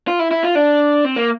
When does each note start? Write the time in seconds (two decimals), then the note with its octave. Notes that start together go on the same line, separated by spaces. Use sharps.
0.08 F4
0.19 E4
0.31 E4
0.44 F4
0.55 D4
1.05 C4
1.16 A#3